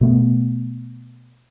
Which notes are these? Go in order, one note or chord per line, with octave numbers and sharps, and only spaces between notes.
B2 A3 B3